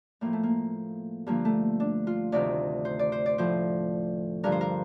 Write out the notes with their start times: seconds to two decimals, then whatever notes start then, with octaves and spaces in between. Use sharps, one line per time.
0.21 A2 F3 A#3
0.33 A3
0.43 A#3
1.27 G2 D3 F3 A#3
1.45 A3
1.80 D4
2.07 F4
2.32 D2 C3 D#3 D5
2.85 C5
2.99 D5
3.12 C5
3.26 D5
3.38 A2 F3 C5
4.43 G2 D3 F3 A#4
4.52 C5
4.61 A#4